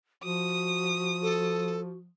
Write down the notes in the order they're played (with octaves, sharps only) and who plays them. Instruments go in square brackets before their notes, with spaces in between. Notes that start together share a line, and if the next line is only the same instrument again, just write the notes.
[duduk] F3 [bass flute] F#4 [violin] D#6
[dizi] A4